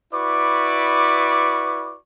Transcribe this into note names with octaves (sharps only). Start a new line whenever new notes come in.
E4 F#4 B4 D5 C#6 D6